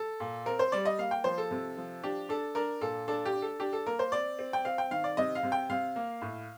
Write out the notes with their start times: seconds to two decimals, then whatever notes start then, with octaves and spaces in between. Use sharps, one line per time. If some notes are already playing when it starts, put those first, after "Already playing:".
Already playing: A4
0.20 A#2
0.46 C4 A#4
0.59 C5
0.72 G3 D5
0.85 D#5
0.98 A#3 F5
1.11 G5
1.24 F3 C5
1.38 A4
1.51 C3
1.77 F3
2.03 D4 G4
2.29 D4 A4
2.55 D4 A#4
2.81 A#2 A4
3.08 D4 A4
3.25 G4
3.33 D4
3.42 A4
3.60 D4 G4
3.73 A4
3.86 A#3 A#4
3.99 C5
4.12 C4 D5
4.39 C4
4.53 G5
4.65 C4 F5
4.78 G5
4.91 D#3 F5
5.04 D5
5.17 C3 D#5
5.35 F5
5.43 C3
5.52 G5
5.70 C3 F5
5.96 A#3
6.21 A2